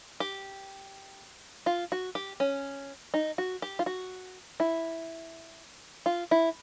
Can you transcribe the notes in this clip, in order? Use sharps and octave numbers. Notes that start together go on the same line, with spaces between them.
G4
F4
F#4
G4
C#4
D#4
F#4
G4
F4
F#4
E4
F4
E4